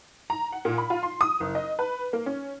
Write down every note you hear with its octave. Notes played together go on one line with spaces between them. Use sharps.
A#5
F#5
A#2
B5
F4
C6
D#6
F#1
D#5
B4
A#3
C#4